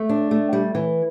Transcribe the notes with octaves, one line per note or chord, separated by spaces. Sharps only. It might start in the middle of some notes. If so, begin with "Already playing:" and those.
Already playing: A3
D4
A3
G3
E3